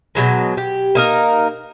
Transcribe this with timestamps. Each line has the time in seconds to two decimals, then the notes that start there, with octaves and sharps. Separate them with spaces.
0.15 B2 F#3 G#3
0.57 G4
0.95 A#3 D#4 A#4